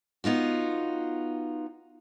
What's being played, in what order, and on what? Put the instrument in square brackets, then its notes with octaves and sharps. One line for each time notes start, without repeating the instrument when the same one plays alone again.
[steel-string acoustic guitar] B3 D#4 F4 F#4